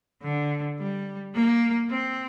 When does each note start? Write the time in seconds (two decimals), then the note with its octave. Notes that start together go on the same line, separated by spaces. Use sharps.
0.23 D3
0.78 G3
1.34 A#3
1.90 C4